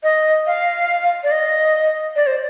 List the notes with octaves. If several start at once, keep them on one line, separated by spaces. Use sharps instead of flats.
D#5
F5
D5
D#5
D5
C5